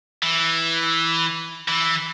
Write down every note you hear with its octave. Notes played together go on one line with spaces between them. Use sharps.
E3
E3